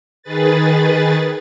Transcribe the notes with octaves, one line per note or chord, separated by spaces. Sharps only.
D#3 G#4 B4 A6